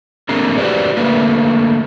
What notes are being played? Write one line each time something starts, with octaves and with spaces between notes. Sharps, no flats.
A3 A#3 C4 D4 G#4 A#4
F#4 G4 B4 C5 D5
D3 A3 A#3 B4